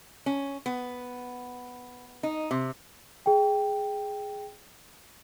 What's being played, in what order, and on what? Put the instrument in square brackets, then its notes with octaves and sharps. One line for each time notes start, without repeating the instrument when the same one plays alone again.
[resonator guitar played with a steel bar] C#4
B3
D#4
C3
[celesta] G#4 G5